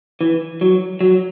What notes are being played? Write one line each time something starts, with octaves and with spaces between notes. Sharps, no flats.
E3
F#3
F#3